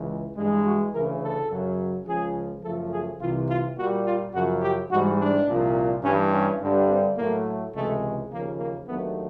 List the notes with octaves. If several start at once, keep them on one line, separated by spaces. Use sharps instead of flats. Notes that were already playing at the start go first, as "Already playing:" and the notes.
Already playing: C#2 E3
G2 E3 G#3
F#4
D2 C#3 E3 A#4
A4
F#2 C#3 F#3
C#2 C#3 F3 G#4
F#2 C#3 F3 A3 A4
G#4
C2 C3 E3 F4
F4
A#2 G3 F#4
F4
F#2 C#3 F3 F#4
G4
G#2 E3 G3 F#4
D4
C2 A#2 F3
G2 E3 G3 C#4
C#4
G2 D3 G3
C4
A2 F#3 A3 A#3
C#2 C3 E3 G#3 A3
D#2 C#3 F3 A#3
A#3
D#2 D3 F#3 A3 B3